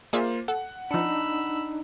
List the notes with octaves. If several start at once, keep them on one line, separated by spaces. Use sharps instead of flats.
A#3 F4 G#4 C5 D5 E5
A4 F#5
F3 D4 D#4 B5 E6 C#7